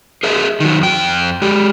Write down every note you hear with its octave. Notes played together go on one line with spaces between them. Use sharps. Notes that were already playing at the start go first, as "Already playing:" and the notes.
G#4 A#4 D#5 E5
D#3 F#3
F2 G5
G#3 G4